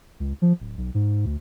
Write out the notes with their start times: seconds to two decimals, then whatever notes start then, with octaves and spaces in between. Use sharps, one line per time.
0.20 C#2
0.42 F3
0.60 D1
0.77 B1
0.94 G#2
1.26 D2